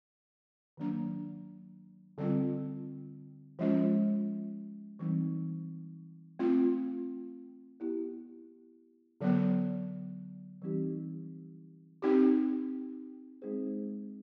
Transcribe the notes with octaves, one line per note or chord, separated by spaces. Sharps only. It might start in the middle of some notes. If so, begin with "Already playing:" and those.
D#3 F#3 A#3 D4
D3 G3 C4 F4
F3 G#3 C#4 F4
E3 G3 C4 D#4
A3 C4 F4
B3 E4 G4
D3 F#3 B3
E3 G3 C4 D#4 G4
C4 D#4 G4
G#3 C4 D#4 G#4 C5